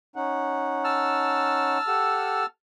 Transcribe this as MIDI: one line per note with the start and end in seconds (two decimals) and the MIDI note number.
0.16 1.78 61
0.16 1.78 63
0.16 1.78 78
0.84 2.46 81
0.84 2.46 88
0.84 2.46 89
1.88 2.44 67
1.88 2.44 69
1.88 2.44 78